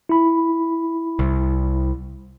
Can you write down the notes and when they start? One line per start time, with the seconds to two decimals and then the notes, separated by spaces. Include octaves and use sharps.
0.09 E4 B5
1.19 C2